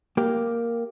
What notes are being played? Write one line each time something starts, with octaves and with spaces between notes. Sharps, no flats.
A#3 G4